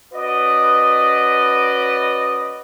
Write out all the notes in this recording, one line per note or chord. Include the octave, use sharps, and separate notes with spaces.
C#4 F#4 B4 D5 D#5